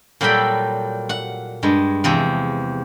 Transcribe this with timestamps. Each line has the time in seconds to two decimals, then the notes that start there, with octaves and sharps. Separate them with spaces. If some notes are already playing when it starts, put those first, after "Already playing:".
0.21 A#2 F#3 G3 A4 G5 B5
1.09 F#5
1.63 G2 G#3
2.04 E2 C3 F3